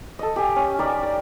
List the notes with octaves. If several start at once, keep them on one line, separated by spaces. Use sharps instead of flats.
A4 D#5
G4 G5 G#5
C#4
D#4 G4 A#4 D5
D5